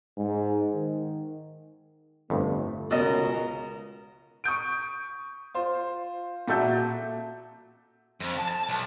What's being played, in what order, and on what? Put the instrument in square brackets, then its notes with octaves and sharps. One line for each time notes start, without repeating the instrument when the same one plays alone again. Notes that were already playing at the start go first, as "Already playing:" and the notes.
[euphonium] G#2
D#3
[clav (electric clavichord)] G1 F2 [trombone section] A3
[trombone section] C#2 [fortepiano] B2 D#5 [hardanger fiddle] A#4
[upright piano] C#6 D#6 G6 D7
F4 C5
A#2 F#4 A4 E5 G6
[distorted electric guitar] F2
A5
A5
B1